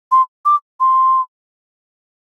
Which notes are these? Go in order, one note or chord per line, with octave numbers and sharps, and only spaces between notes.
C6
D6
C6